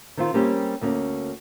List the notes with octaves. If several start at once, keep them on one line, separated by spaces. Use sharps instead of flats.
D#3 C4 F4
G3 A#3 C4 C#4 G4
D2 A#3 C#4